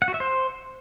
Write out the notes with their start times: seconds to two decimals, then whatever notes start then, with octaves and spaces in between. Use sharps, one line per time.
0.02 F#5
0.08 F#4
0.14 E5
0.20 C5